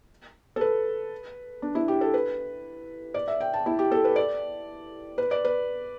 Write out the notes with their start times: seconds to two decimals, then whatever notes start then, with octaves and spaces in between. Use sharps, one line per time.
0.56 A4
0.61 B4
1.62 D4
1.75 E4
1.88 G4
2.01 A4
2.14 B4
3.14 D5
3.28 E5
3.41 G5
3.54 A5
3.66 E4
3.79 G4
3.92 A4
4.04 B4
4.16 D5
5.18 B4
5.31 D5
5.45 B4